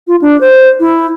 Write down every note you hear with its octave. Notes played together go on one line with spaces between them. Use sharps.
F4
D4
C5
E4